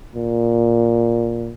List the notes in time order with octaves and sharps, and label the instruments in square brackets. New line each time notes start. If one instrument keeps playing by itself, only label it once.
[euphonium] A#2